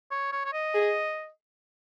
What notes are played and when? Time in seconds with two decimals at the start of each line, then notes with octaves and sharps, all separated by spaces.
0.11 C#5
0.32 C#5
0.45 C#5
0.53 D#5
0.74 G#4